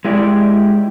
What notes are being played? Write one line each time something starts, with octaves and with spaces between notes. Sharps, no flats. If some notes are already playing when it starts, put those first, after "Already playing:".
G#3 E4 G4 D5